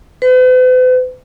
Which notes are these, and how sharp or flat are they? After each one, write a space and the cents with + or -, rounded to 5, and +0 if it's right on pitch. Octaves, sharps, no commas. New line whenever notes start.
B4 +45